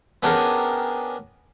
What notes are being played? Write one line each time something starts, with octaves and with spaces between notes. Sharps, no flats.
B3 C#4 D4 G4 G#4 A#4